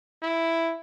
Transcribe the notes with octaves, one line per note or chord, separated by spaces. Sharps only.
E4